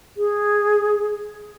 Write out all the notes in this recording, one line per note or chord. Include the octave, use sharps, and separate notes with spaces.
G#4